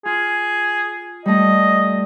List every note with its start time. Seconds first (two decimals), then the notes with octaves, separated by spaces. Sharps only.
0.05 F4 G#4
1.26 G3 A3 D#5